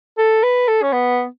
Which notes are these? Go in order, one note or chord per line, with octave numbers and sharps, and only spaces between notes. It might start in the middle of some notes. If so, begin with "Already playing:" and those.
A4
B4
A4
C#4
B3